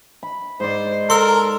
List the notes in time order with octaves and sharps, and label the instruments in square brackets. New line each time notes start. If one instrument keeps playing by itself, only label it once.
[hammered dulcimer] B5
[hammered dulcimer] G#2 D5 [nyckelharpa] C5
[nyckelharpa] A4 [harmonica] A#4 [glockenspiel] C6 E6